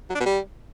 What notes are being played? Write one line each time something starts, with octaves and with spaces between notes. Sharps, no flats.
F#3
D4
B2
G3